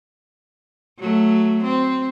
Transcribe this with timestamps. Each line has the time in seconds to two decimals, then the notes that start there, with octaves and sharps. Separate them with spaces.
0.99 F#3 A3
1.63 C4